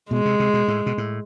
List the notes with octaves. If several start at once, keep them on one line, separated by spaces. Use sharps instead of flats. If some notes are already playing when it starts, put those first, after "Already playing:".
B2 G#3
C3
C3
B2
A2
B2
A2